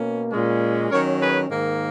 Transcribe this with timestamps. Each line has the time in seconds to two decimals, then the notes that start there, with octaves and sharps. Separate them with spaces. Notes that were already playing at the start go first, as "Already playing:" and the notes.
Already playing: B2 A#3 C#4
0.31 A#2 G#3 C#4
0.90 D#3 F#3 C#4 A#4 C#5
1.21 G#4 B4
1.49 G#2 D#3 A#3